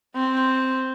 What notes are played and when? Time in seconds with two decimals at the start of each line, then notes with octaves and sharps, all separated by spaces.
0.15 C4